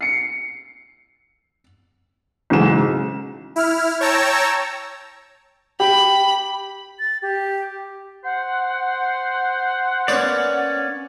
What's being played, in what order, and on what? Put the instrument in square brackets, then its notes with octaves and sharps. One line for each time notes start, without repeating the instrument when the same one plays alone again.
[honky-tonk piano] C7 C#7
[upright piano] B1 G#2 E7 [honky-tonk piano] C#3 E3
[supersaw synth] E4 F6
C#5 G5 A5 A#5 E6
[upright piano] G4 [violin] B5
[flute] A6
G4
[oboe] C5 [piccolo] F#5
[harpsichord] A#3 B3 C#5 [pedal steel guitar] C#4 D5